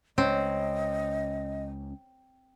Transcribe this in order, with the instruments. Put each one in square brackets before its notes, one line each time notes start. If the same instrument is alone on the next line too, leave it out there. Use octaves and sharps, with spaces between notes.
[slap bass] C#2 [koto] C4 [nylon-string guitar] C#4 [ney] D#5